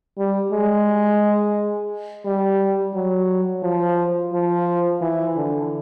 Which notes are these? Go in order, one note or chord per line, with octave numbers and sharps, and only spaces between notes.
G3
G#3
G3
F#3
F3
F3
E3
D3